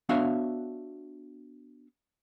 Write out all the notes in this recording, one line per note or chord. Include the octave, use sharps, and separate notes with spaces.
B3 D4 F#4 C#5 E5 F5